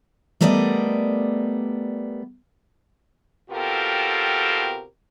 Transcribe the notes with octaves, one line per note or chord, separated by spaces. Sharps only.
G3 A3 B3 A#4 D5 D#5
B2 C4 F4 G4 A4 A#4